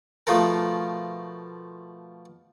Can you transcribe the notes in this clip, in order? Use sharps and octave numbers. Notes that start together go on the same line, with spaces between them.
B2 F3 A3 F4 A4 A#4